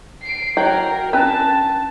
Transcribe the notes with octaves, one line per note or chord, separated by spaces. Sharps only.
C7 D7
F#3 A#4 G5
C#4 D4 B4 A5